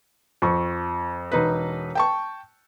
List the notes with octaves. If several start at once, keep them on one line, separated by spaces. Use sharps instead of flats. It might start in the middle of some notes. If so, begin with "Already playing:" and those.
F2 C#6
E1 D#4 B4
G5 A5 C#6